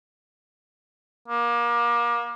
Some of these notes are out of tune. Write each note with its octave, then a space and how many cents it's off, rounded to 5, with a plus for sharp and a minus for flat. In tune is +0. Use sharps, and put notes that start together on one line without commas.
A#3 +30